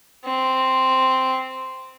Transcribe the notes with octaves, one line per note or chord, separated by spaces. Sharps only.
C4